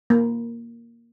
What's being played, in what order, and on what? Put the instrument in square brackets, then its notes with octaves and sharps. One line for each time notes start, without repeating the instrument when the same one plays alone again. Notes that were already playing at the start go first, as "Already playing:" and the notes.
[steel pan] A#3